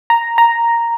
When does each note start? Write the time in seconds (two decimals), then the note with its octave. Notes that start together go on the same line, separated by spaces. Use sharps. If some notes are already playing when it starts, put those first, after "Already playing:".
0.10 A#5
0.38 A#5